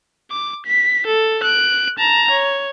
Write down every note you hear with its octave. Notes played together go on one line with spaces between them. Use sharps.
D6
B6
A4
F#6 D7
A5 A#5
C#5